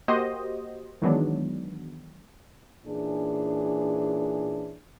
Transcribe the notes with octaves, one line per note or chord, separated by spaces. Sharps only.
A#3 F#4 G4 C5 D#5
D#3 E3 F#3 G#3 B3 D4
A#2 E3 C#4 D4 G#4